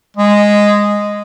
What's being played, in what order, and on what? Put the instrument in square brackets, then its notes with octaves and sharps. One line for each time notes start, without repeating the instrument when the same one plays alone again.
[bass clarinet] G#3